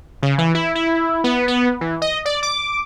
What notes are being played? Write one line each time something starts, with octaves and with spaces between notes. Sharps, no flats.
C#3
E3
E4
E4
B3
B3
E3
D#5
D5
D6